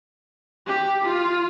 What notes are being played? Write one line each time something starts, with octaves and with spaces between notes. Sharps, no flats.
G4
F4